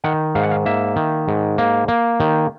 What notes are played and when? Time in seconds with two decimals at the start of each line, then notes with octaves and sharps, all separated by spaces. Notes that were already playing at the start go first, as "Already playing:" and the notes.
0.04 D#3 F#5
0.35 G#2 F5
0.43 F#5
0.51 F5
0.66 A#3 E5
0.96 D#3
1.28 G#2
1.58 A#3
1.88 A#3
2.20 D#3